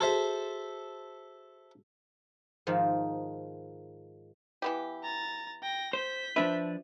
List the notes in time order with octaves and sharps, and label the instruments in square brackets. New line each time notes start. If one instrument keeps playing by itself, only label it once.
[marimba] F#4 G#4 [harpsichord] A4 C5 E5
[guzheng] G#2 D#3 F3
[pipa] E3 B3 G4
[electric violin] A#5 A6
G5 A#6
[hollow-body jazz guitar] C5 [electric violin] G6 B6
[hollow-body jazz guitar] F3 D4 B4 [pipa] E5